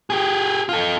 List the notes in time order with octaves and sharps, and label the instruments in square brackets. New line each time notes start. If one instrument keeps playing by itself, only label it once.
[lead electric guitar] G4 G#4
F4 A4